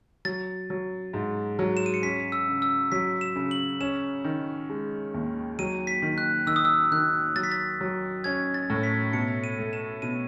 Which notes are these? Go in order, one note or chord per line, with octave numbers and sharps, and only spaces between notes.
F#3 A6
F#3
G#2
F#3
E7
D#7
C#7
C#4 B6
E6
C#3
E6
F#3 B6
E7
C#3
F#7
C#4 E7
D#3
G#3
D#2
F#3 D#7
B6
D#3
F#6
D#3 E6
D#6
E6
D#3 F#6
F#3 A6
B6
A6
F#3
C#4 G#6
A6
A2
B6
B2 C#7
D#7
A3
E7
B2 D#7